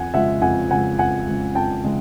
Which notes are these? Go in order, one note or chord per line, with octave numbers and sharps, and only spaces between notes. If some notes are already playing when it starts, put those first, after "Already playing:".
Already playing: F2 F#5 G#5
C#3 F3 G#3 E5 F#5
F2 F#5 G#5
C#3 F3 G#3 F#5 G#5
F2 F#5 G#5
C#3 F3 G#3
F2 G5 A5
C#3 F3 G#3